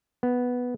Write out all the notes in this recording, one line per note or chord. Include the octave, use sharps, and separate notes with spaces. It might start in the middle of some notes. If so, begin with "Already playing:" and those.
B3